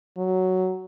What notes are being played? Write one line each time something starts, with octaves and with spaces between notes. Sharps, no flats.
F#3